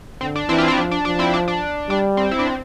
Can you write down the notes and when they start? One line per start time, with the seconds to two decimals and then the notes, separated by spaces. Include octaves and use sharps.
0.21 D3 C4
0.36 D4
0.49 E3 C4 E4
0.58 D4 F4
0.68 C4 E4
0.78 F3 D4
0.91 D4
1.05 F3 D4
1.19 C4 E4
1.34 D4
1.48 D4
1.89 G3 D4
2.17 C4
2.31 E4
2.39 D4
2.47 C4